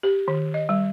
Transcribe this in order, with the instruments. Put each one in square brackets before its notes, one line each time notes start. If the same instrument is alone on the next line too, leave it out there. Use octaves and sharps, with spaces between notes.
[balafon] G4
D#3
D#5
G3